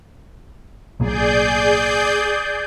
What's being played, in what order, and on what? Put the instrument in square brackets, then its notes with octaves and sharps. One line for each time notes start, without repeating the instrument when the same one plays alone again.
[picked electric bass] B1 A2 A#3 [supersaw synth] G#4 D5 G6